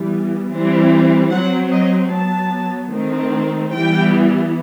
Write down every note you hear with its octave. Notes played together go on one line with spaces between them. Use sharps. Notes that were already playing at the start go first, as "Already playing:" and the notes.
Already playing: E3 G3 B3
E3 G3 C4
F#3 C4 F#5
D#5
F#3 B3 A5
D#3 A3 C4
E3 G3 B3 G5